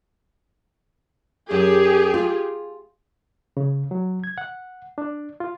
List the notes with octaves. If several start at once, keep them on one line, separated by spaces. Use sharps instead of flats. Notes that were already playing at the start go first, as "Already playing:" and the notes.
F#2 G4 G#4
F4
C#3
F#3
G#6
F#5
D4
F4